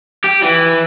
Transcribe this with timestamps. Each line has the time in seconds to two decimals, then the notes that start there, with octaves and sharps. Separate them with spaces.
0.24 G4
0.43 E3